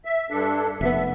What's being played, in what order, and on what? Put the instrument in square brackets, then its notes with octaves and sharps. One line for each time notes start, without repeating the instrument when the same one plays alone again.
[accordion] E5
G2 D4 A4
[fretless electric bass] F1 B2 B3 [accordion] E5